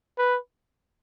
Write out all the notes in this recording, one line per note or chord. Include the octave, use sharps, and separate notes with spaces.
B4